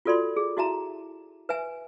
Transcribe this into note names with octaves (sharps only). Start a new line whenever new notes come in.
F4 F#4 A4 D5 B5 C6
G#4
E4 F#4 E5 A5 A#5
B4 E5 G#5